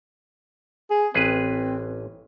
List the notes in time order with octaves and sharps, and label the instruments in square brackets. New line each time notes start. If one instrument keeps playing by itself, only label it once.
[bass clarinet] G#4
[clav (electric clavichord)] A1 G#4 B4 [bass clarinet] C4